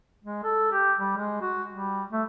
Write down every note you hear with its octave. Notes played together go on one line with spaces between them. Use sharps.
G#3
A4
G4
G3
G#3
F#4
G3
A3